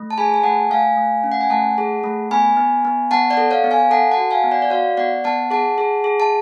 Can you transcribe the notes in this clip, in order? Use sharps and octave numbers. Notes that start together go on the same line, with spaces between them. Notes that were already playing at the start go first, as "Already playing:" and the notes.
Already playing: A3
A5
G#4 G#5 B5
G#5
A3 F#5 A5
A3 F5 G#5
A3
C#4
F#5
G#5
A3 F#5 A5
G#4
A3
B3 G#5 B5
B3
B3
B3 F#5 A5
D5 F#5
A4
C#5 F5
B3
F5 G#5
A4 F#5 A5
F#5 A5
F#4
F5 G#5
B3
D5 F#5
D5
F#4 C#5 F5
B3 D5 F#5
B3 F#5 A5
G#4 F#5 A5
G#4
G#4
A5